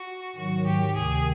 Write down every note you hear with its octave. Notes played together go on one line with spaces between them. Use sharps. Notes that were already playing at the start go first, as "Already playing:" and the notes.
Already playing: F#4
G#2 D#3 F#3 F#4
G4
D2 C3 D#3 G#4